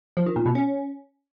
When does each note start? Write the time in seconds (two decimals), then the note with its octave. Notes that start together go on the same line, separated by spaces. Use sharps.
0.17 F3
0.26 D#3
0.36 A#2
0.46 B2
0.55 C#4